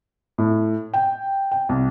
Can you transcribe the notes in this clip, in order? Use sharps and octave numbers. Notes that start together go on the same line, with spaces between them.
A2
G5
G5
C2